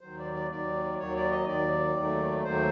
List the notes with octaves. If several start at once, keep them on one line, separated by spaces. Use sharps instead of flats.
D#2 D#3 F#3 C5
D5
D5
D#2 D#3 F#3 D5
D#2 D#3 F#3 C#5
D5
D#5
D#2 D#3 F#3 D5
D#2 D#3 F#3 A3
D#2 D#3 F#3 A3 C5